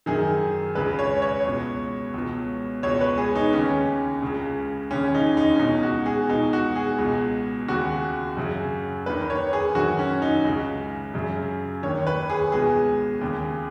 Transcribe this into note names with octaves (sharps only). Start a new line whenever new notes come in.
F#2 D#3 G#4
C#2 C#3 B4
C#5
C#5
C#2 B2
C#2 B2
C#2 B2 C#5
B4
G#4
D#4
D#2 C#3 C#4
C#2 C#3
D#2 C#3 C#4
D#4
D#4
C#4
C#2 B2 D#4
F#4
G#4
C#2 B2 D#4
F#4
G#4
C#2 B2
D#2 C#3 F#4
F#2 C#3
D#2 D#3 B4
C#5
G#4
F#2 D#3 F#4
C#4
D#4
C#2 C#3
F#2 C#3
D#2 D#3 C#5
B4
G#4
C#2 B2 G#4
D#2 C#3